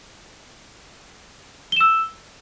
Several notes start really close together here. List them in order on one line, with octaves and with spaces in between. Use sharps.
G7 E7 E6